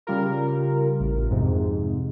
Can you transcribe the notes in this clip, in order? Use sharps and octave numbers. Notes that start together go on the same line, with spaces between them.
C#3 G3 F4 A#4
A1
F2 G#2 C3